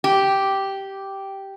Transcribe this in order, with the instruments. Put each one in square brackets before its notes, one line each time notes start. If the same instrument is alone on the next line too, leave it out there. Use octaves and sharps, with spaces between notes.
[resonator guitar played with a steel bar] G4